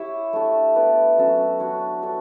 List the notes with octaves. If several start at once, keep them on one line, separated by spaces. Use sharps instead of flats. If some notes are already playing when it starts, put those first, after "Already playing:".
Already playing: E4 G4 C#5 E5
A3 D4 A4
B3 E4 B4 D5
F#3 C#4 F#4 A4
A3 D4 F#4 C#5
D4 A4 C#5